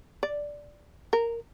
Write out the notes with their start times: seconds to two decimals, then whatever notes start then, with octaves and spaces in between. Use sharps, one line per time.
0.23 D5
1.13 A#4